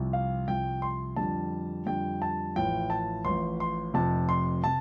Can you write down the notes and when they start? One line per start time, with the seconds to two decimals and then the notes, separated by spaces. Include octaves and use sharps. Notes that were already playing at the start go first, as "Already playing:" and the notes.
Already playing: C2 C3 F3
0.13 F5
0.48 C2 C3 F3 G5
0.82 C6
1.16 F2 D3 G3 A5
1.86 F2 D3 G3 G5
2.22 A5
2.56 A1 A2 F3 G5
2.90 A5
3.25 A1 A2 F3 C6
3.60 C6
3.94 F1 F2 C3 A5
4.29 C6
4.64 C3 A5